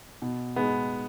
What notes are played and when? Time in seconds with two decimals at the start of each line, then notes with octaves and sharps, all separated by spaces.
0.22 B2
0.56 G#3 B3